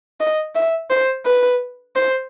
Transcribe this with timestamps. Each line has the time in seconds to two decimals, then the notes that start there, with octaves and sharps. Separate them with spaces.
0.20 D#5
0.55 E5
0.90 C5
1.26 B4
1.96 C5